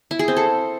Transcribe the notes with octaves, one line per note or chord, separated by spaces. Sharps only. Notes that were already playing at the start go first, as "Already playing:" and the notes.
E4
G#4
C4
A4